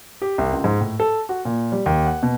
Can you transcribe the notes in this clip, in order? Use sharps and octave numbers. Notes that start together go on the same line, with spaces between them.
G4
C2
C#2
G#2
A2
A4
F#4
A#2
G3
D#2
F#5
B2